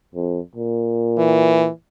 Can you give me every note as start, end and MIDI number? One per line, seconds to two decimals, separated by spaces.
0.15 0.40 41
0.56 1.68 46
1.18 1.69 52